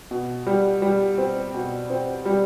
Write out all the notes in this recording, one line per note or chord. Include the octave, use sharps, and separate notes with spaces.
B2
G3
G3
C4
B2
C4
G3